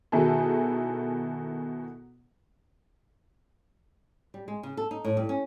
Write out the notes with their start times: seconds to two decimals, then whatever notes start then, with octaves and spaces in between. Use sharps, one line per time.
0.12 B2 D#3 E4 G#4 A4
4.34 G3
4.48 G#3
4.63 C#3
4.77 A4
4.91 D#4
5.05 A2
5.17 G2
5.29 C#4